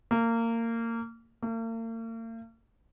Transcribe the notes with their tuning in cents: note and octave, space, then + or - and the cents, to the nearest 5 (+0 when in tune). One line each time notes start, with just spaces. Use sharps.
A#3 -25
A#3 -45